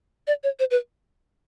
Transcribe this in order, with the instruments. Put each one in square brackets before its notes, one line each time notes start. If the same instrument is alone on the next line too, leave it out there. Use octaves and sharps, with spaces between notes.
[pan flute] D5
C#5
C5
B4